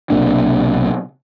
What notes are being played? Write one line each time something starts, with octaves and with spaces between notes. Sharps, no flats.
B1 C3 A#3 D4